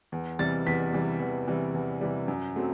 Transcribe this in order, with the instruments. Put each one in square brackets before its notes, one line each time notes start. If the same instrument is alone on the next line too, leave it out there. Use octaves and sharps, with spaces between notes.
[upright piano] E2
C3 E3 G3 A6
E2 B6
C3 E3 G3
E2
C3 E3 G3
E2
C3 E3 G3
F#2
F#3 A3 C4